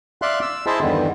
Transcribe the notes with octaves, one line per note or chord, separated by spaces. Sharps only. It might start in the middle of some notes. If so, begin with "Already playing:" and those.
D5 E5 F5 C6 F#6
E6
E4 G#4 C5 D#5 E5 A5
E2 G2 D3 D#3